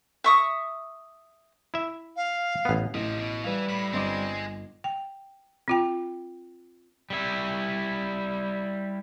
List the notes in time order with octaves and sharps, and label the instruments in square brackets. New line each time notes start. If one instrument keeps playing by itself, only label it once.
[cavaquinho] E5 C#6 D#6
[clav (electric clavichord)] E4 E5
[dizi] F5
[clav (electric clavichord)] A1 B3
[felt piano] A1 [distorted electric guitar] C3 F3 [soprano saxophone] D#5
[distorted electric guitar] B2
[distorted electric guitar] E3 [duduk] G3 [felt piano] B4 F5
[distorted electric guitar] A2 [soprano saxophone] B5
[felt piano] G1 D#5 D6 [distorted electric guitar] G#3 [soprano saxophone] C4
[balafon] G5
C4 F4 G5
[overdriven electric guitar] G3 E4